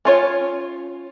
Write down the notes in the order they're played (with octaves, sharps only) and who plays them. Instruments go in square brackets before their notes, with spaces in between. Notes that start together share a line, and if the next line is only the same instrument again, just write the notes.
[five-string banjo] C#4 F4 C#5